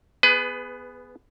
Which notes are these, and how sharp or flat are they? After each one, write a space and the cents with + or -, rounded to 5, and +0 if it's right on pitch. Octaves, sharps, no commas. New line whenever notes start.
B3 +0 G#4 +0 B4 +25